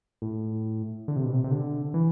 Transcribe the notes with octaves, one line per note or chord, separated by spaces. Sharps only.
A2
D3
C3
B2
C3
C3
D3
E3